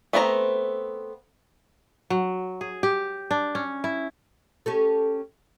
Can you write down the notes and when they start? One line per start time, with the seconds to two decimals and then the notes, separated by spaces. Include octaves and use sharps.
0.13 A3 B3 C4 F4 A#5
2.10 F#3
2.61 G#4
2.83 G4
3.31 D4
3.55 C#4
3.84 E4
4.66 C#4 G4 A4